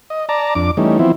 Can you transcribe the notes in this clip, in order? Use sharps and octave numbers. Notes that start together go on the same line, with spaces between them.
D#5
D5 A5 A#5
F2 D4 D6
E3 G3 A3 C#4 D#4
E3 F3 B3 C4 E4